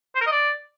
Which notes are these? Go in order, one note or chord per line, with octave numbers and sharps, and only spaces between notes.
C5
A#4
D#5
D5